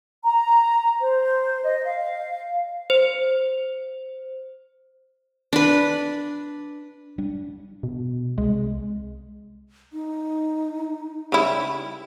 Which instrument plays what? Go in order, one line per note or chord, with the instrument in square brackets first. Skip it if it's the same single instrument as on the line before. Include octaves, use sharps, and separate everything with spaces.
[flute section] A#5
C5
D#5
F5
[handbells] C5
[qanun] D4 B4
[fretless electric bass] G3 D4
[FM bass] B2
[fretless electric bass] C2 [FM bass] G#3
[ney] D#4
[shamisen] C#3 G3 E4